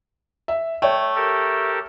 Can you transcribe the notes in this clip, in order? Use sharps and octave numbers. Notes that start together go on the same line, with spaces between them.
E5
A3 C#5 G5
G4 A4 A#4